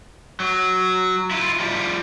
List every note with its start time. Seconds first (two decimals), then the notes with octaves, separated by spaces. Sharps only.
0.40 F#3
1.31 E4 F4
1.60 F3 G3